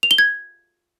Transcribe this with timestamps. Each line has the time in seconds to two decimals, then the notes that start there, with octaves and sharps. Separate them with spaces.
0.03 F7
0.11 G7
0.18 G#6